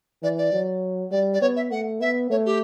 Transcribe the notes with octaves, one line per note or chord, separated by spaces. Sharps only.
E3 D5
D5
F#3
G3 D5
D5
B3 C#5
E5
A3 F#5
B3 E5
A3 C#5
G4